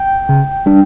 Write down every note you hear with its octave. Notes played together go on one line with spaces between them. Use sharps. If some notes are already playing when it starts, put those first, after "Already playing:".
Already playing: G5
C#3
G3 D4